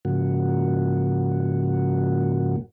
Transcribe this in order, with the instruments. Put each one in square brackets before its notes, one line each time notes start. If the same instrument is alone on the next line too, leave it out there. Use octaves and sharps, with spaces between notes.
[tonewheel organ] G#2 C#3 F3 A#3 F#4